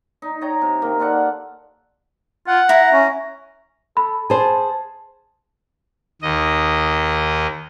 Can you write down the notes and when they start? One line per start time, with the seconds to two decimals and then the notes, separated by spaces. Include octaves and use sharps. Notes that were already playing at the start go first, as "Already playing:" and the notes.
0.22 D#4
0.41 C#5 D#5 G5 A#5
0.62 C3
0.82 D#3 A#3
0.99 F4 A4 D5 F#5
2.47 F4 F#5
2.69 E4 E5 A#5
2.93 C#4
3.97 A4 B5
4.30 G#4 C5 A5
6.22 D#2 D#5